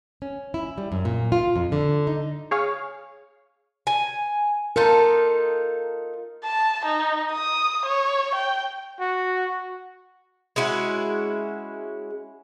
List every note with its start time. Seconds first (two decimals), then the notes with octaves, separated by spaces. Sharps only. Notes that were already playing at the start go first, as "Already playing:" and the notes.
0.22 C#4
0.54 E4
0.78 G3
0.92 F#2
1.05 A#2
1.32 F4
1.56 F2
1.72 D3
2.07 D#4
2.51 G#4 C#5 F5
3.87 G#5
4.76 D#4 F4 A4 A#4
6.45 A5
6.86 D#4
7.33 D#6
7.86 C#5
8.35 G5
9.00 F#4
10.56 G#3 C#4 E4 F#4